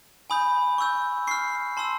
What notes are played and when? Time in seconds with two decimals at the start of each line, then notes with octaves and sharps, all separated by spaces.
0.30 G#5 B5 D#6 G6
0.78 C#6 E6 G6
1.27 C#6 F6 C7
1.77 A5 C6 E6